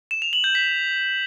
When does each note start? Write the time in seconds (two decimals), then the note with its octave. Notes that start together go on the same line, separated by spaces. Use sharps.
0.11 E7
0.22 F7
0.33 F#7
0.44 G6
0.55 B6